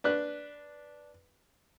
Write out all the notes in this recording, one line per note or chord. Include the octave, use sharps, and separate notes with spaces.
D4 B4 F#6